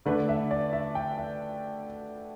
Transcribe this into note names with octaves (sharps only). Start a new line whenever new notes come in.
D3 A3 D4 B4
E5
D5
E5
G5
E5